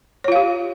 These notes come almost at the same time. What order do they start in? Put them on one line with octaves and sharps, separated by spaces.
C#5 F4 F5 G4